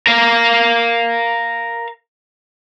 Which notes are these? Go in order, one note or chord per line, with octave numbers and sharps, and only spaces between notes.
A#4 F5